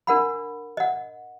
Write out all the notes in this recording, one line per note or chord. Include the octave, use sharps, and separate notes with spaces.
D4 A#4 F#5 B5
D#5 F#5